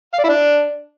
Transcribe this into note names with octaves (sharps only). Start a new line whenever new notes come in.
F5
D5
E4
D4